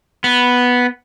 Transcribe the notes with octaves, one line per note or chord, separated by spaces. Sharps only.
B3